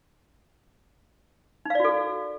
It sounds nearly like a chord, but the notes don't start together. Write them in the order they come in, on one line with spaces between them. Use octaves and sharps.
D#4 F5 D5 F#4 A4